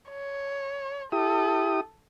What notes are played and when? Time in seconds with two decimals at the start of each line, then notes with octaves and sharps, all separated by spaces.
0.11 C#5
1.12 E4 G4 A4 D#6